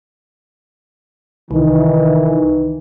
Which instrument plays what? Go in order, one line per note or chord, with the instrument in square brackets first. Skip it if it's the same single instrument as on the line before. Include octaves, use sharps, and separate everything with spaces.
[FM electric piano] C2 [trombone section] D#3 E3